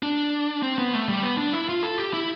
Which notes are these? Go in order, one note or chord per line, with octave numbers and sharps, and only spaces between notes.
D4
C4
B3
A3
G3
B3
D4
E4
F4
A4
G4
E4